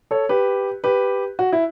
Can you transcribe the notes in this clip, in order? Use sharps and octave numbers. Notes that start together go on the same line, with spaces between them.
A4 C#5
G4 B4
G4 B4
F#4
E4